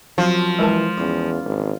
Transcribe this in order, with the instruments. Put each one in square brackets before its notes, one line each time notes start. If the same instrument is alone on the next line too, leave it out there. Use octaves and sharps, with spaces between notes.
[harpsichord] F#2 F#3 C4 [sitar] F3
[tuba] E3 [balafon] G#3 A#4 A5
[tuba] E2 [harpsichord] C#3 E3
[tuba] G#1